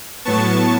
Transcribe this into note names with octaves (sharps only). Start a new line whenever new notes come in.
A2 F#3 B3 A5 C#6